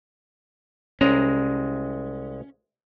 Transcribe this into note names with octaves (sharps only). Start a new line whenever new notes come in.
C2 G#3 C#4 A#5